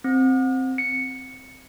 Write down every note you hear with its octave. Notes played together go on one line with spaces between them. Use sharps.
C4
C#7